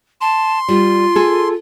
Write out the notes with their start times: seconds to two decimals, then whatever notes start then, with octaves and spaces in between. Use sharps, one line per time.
0.21 A5 C6
0.68 G3 F4
1.16 G#4 A4